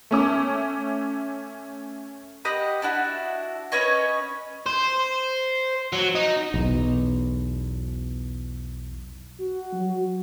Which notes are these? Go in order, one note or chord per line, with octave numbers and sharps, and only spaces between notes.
A3 C#4 D6
G4 D#5 F#5 B5
D4 E4 F#4
C#4 B4 C#5 D#5
C5
F#3
D#4
B1 E2
F#4
F#3